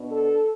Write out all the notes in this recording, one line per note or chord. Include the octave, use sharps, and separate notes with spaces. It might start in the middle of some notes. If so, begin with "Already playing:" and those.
Already playing: B2 B3 D4
A4